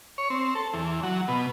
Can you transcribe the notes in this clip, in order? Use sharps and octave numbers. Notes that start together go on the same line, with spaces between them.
C#5
C4
A4
E2
F#3
B2